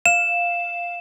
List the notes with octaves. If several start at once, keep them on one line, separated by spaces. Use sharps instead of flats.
F5 E7